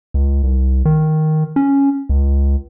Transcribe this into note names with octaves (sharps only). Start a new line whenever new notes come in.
C#2
C2
D#3
C#4
C#2